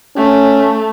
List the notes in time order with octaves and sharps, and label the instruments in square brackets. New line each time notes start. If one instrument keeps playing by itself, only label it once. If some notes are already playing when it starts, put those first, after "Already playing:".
[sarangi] A3 [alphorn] C#4